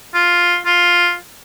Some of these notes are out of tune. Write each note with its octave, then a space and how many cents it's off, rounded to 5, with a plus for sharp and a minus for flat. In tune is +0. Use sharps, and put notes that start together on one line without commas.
F4 +5
F4 +5